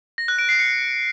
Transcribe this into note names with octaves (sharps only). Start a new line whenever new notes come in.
A#6
F#6
D7
C7
C#7